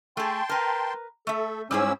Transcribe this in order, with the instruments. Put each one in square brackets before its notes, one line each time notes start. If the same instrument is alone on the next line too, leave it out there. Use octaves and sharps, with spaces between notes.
[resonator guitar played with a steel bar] A3 G#4 [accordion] G5 A5 C6
[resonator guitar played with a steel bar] A#4 B4
[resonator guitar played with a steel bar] A3 E5 [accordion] A4
[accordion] G#2 C#4 E6 [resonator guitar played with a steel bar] G3 E4 G#4